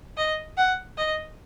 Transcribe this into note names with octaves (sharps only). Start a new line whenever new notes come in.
D#5
F#5
D#5